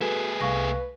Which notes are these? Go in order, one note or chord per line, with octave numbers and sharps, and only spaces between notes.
A3 F#4 G#4 A4 B4 E7
C2 F5 C#6 A#6